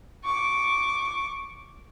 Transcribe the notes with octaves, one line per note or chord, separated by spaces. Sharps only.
C#6 D6